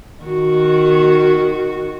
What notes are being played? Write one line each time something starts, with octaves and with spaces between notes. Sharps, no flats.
D#3 F#4